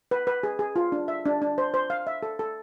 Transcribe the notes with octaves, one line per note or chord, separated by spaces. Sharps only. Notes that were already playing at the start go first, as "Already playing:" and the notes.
B4
B4
G#4
G#4
F4
D4
E5
D4
D4
C5
C5
F5
E5
A4
A4